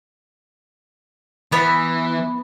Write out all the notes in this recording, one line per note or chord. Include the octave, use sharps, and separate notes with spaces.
E3 B3 B5